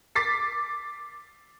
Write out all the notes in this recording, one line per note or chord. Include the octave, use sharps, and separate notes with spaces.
D6 A6 B6 C7